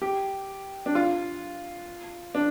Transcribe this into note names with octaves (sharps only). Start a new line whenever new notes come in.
G4
D4
F4
D4